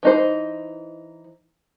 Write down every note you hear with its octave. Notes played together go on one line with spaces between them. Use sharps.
E3 D#4 C5